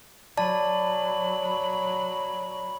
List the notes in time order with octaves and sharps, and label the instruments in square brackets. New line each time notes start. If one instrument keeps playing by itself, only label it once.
[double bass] F#3 [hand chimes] D5 A5 [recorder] B5